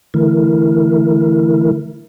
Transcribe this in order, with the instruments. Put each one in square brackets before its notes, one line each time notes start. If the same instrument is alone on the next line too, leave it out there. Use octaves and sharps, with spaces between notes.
[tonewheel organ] D3 E3 A3 E4 A#4